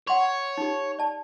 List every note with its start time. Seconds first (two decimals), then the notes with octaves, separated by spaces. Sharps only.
0.08 C#5 F#5 C6
0.58 D#4 G4
0.99 D5 A5